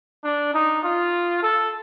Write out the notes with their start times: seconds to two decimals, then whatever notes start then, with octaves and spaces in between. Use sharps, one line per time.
0.24 D4
0.54 D#4
0.84 F4
1.43 A4